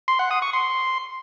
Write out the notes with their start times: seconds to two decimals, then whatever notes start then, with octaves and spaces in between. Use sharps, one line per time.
0.08 C6
0.19 F#5
0.31 D#6
0.42 C#6
0.53 C6